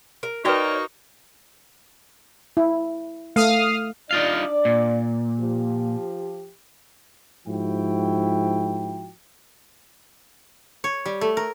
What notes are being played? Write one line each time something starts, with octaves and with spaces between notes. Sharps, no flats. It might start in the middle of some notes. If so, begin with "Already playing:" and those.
A#4
A#3 D#4 F#4 B4 C#5 D5 G5 C#6
E4
A3 F5 D#6 F6
D4 D#4 F4 D5 F5
A#2
F3 G4
G#2 F3 E4 F#4 G5
C#5
G3
A3
A#4